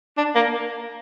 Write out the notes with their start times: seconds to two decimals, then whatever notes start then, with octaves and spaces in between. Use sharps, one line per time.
0.17 D4
0.35 A#3